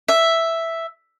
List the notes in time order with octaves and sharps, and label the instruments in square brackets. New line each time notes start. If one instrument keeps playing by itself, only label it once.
[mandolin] E5